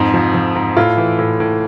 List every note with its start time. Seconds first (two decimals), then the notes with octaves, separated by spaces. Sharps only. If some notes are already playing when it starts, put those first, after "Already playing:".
Already playing: F2 G#2
0.14 F3
0.34 F3
0.55 G#2
0.77 A2 F4
0.97 E3
1.19 A2
1.40 A2